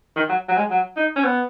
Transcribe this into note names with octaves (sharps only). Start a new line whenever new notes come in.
D#3
F#3
F#3
G#3
F#3
D#4
C#4
B3